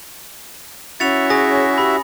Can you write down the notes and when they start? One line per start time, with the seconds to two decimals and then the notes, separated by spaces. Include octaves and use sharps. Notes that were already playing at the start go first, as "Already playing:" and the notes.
1.00 C#4 E4 F#4 E5 A6 C#7 F7
1.30 G#4 C#5 G#5 D#6 A#6
1.78 G4 B5 E6